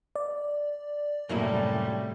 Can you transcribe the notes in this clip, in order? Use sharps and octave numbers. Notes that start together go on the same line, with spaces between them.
D5
F#2 A2 C3 G3 A#3 E4